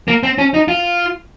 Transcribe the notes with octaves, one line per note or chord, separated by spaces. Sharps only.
A#3
C4
C#4
D#4
F4